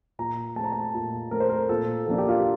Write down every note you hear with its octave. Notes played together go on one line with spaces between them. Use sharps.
A#2 A#5
A3 C4 A5 A#5
A5
A#2
A3 C4 A#4
C5
A#4
A#2 A4
F3 A#3 D4 A4
G4
F4
G4